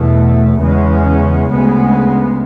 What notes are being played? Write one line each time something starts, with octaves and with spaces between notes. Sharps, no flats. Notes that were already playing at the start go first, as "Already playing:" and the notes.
Already playing: E2 B2 A3
E2 C#3 G#3 C#4
D2 C#3 G#3 B3